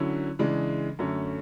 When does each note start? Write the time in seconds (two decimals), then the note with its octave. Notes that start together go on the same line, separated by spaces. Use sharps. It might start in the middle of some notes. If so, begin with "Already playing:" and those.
Already playing: D3 F#3 C#4 E4
0.39 C#3 E3 G#3 D4
0.99 F#2 D3 A3 C#4